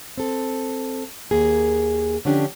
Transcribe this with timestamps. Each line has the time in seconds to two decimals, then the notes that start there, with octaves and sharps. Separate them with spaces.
0.18 C4 A4
1.31 D#2 A#3 G#4
2.25 D3 F3 C#4 D4 G4